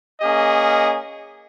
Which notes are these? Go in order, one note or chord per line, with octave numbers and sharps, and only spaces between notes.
A#3 C#4 G#4 D#5